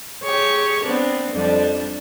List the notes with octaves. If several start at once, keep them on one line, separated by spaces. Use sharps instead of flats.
G4 G#4 C#5
B3 C4 D4
F2 G3 D4